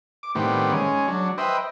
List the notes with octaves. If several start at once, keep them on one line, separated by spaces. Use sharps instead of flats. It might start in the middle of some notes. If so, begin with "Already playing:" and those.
D6
A2 D#3 G3 B3 C4
G#3 C#4
F#3 D4
B4 C5 D#5 E5 G5